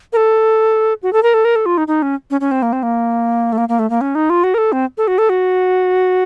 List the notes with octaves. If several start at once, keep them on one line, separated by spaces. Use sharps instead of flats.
A#4
A4
F#4
A4
A#4
A4
A#4
A4
F4
D#4
D#4
C#4
C#4
C#4
C4
A#3
C4
A#3
A3
A#3
A#3
A3
A#3
C#4
D#4
F4
F#4
A#4
A4
C4
A4
F#4
A4
F#4